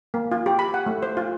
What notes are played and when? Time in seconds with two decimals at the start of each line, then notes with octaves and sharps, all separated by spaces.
0.14 A#3
0.32 F4
0.46 G4
0.59 B5
0.74 F#5
0.86 A3
1.02 C5
1.17 F4